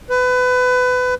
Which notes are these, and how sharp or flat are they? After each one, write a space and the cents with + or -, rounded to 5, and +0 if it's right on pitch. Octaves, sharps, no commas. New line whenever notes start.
B4 +25